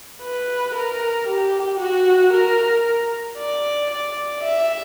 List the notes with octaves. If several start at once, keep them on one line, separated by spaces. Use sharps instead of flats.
B4
A#4
G4
F#4
A#4
D5
D5
E5